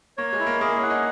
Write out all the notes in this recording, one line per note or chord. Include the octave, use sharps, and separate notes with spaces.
A#3 C#5
G#3
E4
A#3
A#3 G#4
C#4
F#5
D#4